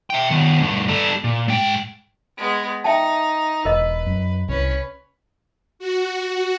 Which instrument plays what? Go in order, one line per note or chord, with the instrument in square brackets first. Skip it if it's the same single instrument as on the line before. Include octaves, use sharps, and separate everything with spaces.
[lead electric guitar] E5 G5
D#3 B3
D2 G2
G3 A4
A#2
G#2 G5
[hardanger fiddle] G#3 B3
[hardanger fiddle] D#4 [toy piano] E5 G5 A5
[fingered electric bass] E1 [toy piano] A#4 D#5 [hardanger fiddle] B4
[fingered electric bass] F#2
[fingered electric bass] C2 [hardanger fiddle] C#4 B4
[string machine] F#4